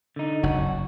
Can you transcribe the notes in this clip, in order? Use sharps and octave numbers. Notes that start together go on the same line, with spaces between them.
D3 D#4
F#1 F#4